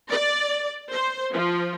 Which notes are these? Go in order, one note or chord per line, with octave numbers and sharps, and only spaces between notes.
D5
C5
F3